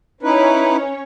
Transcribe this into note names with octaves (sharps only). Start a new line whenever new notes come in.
C#4 D#4 E4 B4 C#5